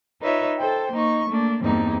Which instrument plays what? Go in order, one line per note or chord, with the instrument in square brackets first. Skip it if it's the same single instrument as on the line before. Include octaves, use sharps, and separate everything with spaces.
[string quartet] D#4 F4 B4 C#5 E5
A4 C5 G5
A#3 D#4 C#6
A3 A#3 D4
E2 G2 G3 A#3 C4 D#4